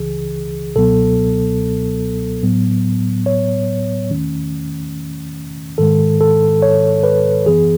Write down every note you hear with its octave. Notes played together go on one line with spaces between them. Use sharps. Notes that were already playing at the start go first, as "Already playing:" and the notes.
Already playing: C#2 C#3 E3 G#4
C#2 B2 F#3 B3 A4
A2 F#3 B3
C#5
E2 D#3 A3 C#4
G#2 D#3 G#3 A4
A4
C#5
B4
F#2 E3 B3 G#4